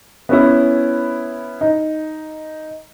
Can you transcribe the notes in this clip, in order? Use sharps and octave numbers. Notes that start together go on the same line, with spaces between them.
B3 C#4 E4
D#4